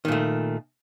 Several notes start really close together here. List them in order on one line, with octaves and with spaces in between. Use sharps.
D#3 A#2 A3